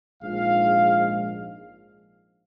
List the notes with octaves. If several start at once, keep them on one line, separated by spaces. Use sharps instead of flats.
A#1 G#2 F3 G#3 F5